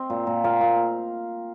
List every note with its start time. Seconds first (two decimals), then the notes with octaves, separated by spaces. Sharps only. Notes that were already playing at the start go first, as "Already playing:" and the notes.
Already playing: C4 D#5
0.10 A#2
0.27 A#2
0.44 A#2 F5
0.61 A#2